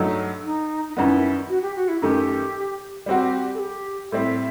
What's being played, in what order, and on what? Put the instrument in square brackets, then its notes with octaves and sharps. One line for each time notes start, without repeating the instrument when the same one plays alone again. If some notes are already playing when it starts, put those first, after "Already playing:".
Already playing: [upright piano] G2 F#3 A3 D#4
[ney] D#4
D#4
[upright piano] F#2 D#3 G3 B3 [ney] E4
[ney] F#4
G4
F#4
E4
[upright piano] F#2 D#3 A3 [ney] G4
[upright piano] G3 C4 F#4 [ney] G4
[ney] A4
G4
[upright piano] A2 G3 C4 [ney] E5